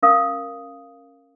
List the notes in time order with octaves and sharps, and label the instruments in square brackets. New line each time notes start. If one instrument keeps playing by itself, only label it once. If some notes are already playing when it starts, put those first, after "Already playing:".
[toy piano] C#4 A#4 F5 D#6